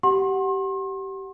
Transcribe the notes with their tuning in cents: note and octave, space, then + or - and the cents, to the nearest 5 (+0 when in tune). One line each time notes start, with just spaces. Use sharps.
G4 -20 F#5 +0 C6 +40